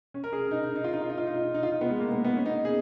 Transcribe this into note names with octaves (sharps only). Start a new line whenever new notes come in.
C#4
A#4
G#4
D#4
D#4
D#4
F4
D#4
F4
D#4
F4
D#4
D#4
F4
D#4
B3
G#3
A#3
B3
B3
C#4
D#4
G#4